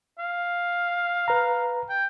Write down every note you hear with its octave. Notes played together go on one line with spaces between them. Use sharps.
F5
B4 A#5
G5